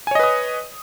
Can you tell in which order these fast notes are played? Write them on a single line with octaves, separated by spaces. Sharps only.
G#5 C#5 D#5 B4 D#6